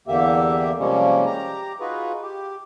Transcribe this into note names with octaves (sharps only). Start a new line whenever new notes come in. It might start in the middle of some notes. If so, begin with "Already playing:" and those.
E2 D3 A#3 G4 E5
C3 F3 G3 G#3 A#3 C#4
G4 A#5
D#4 F4 F#4 G#4 B4
G4